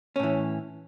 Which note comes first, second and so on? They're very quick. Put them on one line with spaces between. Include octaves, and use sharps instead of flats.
C#4 A2 E3